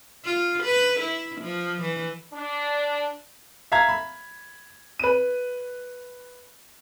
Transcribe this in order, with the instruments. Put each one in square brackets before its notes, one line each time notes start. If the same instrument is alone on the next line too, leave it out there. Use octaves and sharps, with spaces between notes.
[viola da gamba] F4
B4
E4
F3
E3
[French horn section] D4
[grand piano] E5 F5 A#5 G#6
B5
[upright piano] B4 D#7